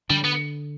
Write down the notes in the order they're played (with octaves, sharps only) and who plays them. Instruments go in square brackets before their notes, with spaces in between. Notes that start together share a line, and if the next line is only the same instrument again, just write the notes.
[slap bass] D3 [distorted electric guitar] G3
[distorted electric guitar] B3